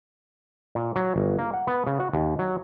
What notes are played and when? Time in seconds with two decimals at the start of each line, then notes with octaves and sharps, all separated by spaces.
0.75 A#2
0.96 F#3
1.16 G1
1.39 A#3
1.53 F#5
1.67 B3
1.87 C#3
2.00 F#4
2.13 D#2
2.39 F#3